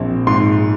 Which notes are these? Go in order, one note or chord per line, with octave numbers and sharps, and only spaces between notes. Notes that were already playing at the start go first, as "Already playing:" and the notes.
Already playing: A#1 C4
G#2 C6